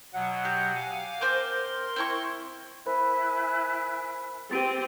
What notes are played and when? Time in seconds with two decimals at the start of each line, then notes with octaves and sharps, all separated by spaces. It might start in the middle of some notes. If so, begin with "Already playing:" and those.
0.14 B2 F#3 F#5
0.45 G4
0.76 F5 G#5 D6
1.21 C4 A#4 C5 C6 D6
1.96 C4 E4 C#6
2.86 E4 A#4 C5 G#5 B5 F#6
4.51 C4 G4 A6 D7 D#7